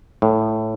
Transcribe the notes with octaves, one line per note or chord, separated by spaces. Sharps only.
A2